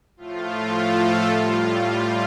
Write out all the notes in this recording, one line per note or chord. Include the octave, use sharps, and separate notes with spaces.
A2 F3 A3 F4
A4
A2 G3 F4